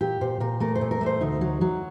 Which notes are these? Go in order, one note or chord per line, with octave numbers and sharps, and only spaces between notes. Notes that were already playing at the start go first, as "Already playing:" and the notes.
A#2 G4
A#2 C5
A#2 A#4
A3 A#4
C5
A#2
A#4
A3
C5
D2 D#4
F#3
F#3